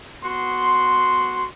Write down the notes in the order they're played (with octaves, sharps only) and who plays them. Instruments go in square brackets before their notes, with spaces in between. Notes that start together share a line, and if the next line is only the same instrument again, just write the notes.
[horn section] B3 F#4 C6